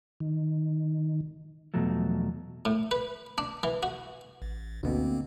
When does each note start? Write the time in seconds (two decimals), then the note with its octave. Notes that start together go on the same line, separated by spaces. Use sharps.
0.20 D#3
1.74 E2 B2 F3 F#3 A3
2.65 A2
2.91 B4
3.38 D4
3.63 E3
3.83 F#4
4.42 A1
4.83 D2 B2 D3 A#3 C4